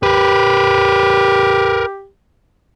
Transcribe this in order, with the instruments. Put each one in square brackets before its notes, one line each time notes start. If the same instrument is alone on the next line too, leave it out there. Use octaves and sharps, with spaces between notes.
[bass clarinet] G4 [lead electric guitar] A#4 B4